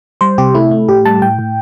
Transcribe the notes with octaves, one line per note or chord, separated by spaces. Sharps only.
G3 C5
C3 G4
A3 E4
A3
A2 G4
G3 A5
A2 G5
A2